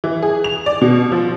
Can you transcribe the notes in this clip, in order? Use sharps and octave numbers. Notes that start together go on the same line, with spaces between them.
E3
G#4
F7
D5
B2
F3